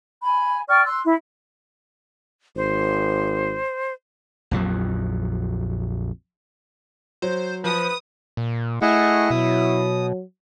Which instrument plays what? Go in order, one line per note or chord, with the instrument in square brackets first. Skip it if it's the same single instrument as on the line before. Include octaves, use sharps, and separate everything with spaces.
[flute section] G#5 B5
D5 G5 C#6 F6
C6 E6 F#6
E4
[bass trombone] G#1 [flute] C5
[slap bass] A#1 F2 F3 F#3
[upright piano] F#3 [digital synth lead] C5
[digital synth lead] F3 [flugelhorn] B4 [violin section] D#6
[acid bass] A#2
[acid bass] A3 [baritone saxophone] E4 [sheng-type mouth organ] G#4 D#5 F#5
[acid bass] B2 [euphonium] F#3 [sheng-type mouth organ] D#6